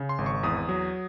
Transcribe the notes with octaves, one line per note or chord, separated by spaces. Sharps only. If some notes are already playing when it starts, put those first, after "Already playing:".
Already playing: C#3
C6
G#1
C#6
E2 D#6
F#3